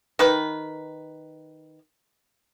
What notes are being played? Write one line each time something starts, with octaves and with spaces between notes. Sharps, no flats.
D#3 B4